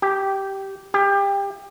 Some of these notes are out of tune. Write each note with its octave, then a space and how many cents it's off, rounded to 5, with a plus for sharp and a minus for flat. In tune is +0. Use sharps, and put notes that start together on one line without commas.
G4 -10
G4 +25